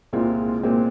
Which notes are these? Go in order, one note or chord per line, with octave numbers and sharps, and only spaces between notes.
C2 A#2 G#3 C4 F4
A#2 G#3 C4